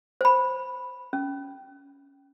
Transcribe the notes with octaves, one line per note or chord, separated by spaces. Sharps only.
C5 B5
C#4